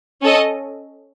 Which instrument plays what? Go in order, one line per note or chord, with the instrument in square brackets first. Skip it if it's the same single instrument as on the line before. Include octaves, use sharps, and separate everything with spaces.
[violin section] C#4 A4 D#5